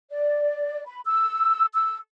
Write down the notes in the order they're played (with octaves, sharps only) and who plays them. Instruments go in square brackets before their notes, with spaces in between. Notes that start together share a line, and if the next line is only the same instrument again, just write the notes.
[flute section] D5
B5
E6
E6